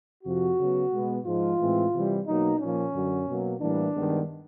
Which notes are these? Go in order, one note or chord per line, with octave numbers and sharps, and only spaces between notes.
F2 C3 F3 F#4
C#3 F#3 B3
B2 G#3 B3
G#2 F3 G#3 F4
A2 E3 G#3 C4
C3 E3 G3
B2 F#3 A#3 D#4
A#2 F3 A#3 C#4
F#2 D3 F#3
B2 F#3 A#3
A2 E3 G3 A#3 D4
G2 D#3 G#3 B3